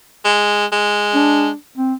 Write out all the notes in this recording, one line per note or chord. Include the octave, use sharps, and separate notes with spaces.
G#3
G#3
D4
C4